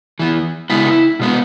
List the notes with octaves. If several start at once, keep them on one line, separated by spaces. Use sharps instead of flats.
E3 B3
C#3 G#3 B3 E4
B2 G#3 B3